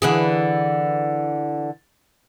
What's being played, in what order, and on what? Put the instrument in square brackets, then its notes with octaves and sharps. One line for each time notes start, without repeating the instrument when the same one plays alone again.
[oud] D3 E3 G#4